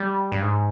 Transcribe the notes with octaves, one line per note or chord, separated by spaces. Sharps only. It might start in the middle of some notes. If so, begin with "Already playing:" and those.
Already playing: G3
G2
G#2